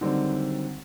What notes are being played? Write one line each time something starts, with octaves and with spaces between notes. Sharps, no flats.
D3 D#3 F#3 G3 C4 D#4